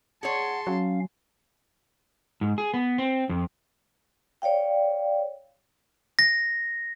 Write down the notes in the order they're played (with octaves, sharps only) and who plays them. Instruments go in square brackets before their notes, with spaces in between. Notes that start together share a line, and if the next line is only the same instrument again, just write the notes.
[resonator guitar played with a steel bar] G#4 C#5 [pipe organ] F#5 [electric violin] A5 C6
[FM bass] F#3 [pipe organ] C#4 F5
[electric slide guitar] G#2
G#4
B3
C4
F2
[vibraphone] C#5 D5 F5 G5
[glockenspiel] A#6